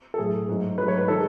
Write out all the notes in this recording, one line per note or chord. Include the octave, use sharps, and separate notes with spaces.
A4
A2 F#3 A3 G#4
G#2 F#3 A3
G#2 F#3 A3 B4
C#5
B4
D#3 G#3 A4